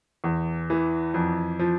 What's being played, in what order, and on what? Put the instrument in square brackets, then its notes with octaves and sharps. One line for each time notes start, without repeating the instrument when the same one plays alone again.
[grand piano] E2
E3
F2
F3